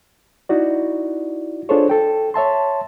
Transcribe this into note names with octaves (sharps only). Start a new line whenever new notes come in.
D#4 E4 F#4 D5
D4 F4 G#4 A4 C5 C#5
A4 G5
C#5 E5 A5 C6